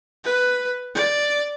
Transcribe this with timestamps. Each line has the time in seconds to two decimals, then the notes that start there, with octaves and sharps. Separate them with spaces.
0.24 B4
0.95 D5